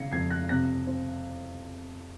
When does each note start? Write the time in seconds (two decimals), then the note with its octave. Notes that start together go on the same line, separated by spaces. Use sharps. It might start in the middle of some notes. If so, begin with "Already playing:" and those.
Already playing: C#3 G#6 A#6 C7 C#7
0.12 F2 G#6 C7
0.30 F#6 A#6
0.49 C3 F#6 A#6
0.87 C4